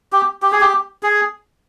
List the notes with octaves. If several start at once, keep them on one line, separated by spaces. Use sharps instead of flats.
G4
G4
G#4
G4
G#4